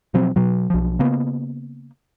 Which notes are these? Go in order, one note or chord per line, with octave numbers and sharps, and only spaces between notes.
B2 F3 F#3 C4
B2 F#3
B1 F3
C#3 A#3 B3